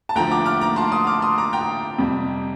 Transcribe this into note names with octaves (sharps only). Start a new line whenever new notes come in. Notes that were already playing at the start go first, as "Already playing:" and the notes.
A5
D2 D3 F3 G5 A#5
A#5 D6
D6 F6
A#5 D6
A5 C6
C6 D#6
D6 F6
C6 D#6
A#5 D6
G5 A#5
F2 C3 G3